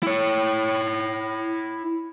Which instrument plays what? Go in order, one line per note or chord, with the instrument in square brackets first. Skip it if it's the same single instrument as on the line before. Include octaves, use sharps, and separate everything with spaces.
[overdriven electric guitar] E4 C#5